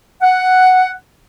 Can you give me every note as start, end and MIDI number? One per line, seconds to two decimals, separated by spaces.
0.21 0.92 78